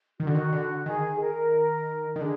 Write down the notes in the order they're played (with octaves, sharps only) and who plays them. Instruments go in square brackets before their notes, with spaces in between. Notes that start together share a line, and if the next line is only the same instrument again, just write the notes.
[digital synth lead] D#3 [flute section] F#4
[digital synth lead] D3
D#3
D3
[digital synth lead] D#3 [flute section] G#4
[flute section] A#4
[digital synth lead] D#3
[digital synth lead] D3 [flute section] G#4